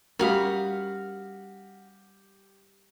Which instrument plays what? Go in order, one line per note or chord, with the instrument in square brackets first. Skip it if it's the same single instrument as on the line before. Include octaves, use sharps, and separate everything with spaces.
[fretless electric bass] G3 C#4 [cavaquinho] F#4 F5 D#6 [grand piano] G4 [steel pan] A#4 B5